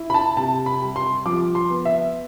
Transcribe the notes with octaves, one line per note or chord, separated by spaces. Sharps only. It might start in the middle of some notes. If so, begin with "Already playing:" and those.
Already playing: E4
B5
A5
C3 A5
B5
G3
C6
F3 D6
C6
B3
E5